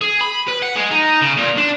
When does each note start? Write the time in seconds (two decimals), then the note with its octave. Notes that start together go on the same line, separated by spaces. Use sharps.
0.01 G#4
0.21 B5
0.48 B4
0.63 F#5
0.76 G#3
0.91 D#4
1.22 C#3
1.37 A#2
1.57 D4